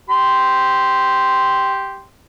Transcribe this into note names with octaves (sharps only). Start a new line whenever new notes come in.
G4 C6